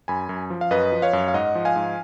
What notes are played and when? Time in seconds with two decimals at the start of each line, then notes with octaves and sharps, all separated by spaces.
0.08 F#2 G#5 B5
0.29 F#2
0.50 F3
0.61 F5
0.71 F#2 B4 D#5
0.92 F3
1.02 C#5 F5
1.13 F#2
1.28 F5
1.34 G#2 D#5 F#5
1.55 F3
1.65 F5 G#5
1.76 G#2